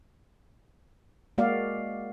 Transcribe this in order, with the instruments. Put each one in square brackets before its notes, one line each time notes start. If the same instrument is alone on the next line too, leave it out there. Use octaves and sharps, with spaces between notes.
[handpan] G#3 A#3 F#4 D5 F5